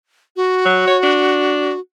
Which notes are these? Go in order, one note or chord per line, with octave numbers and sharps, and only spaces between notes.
F#4
F#3
C#5
D4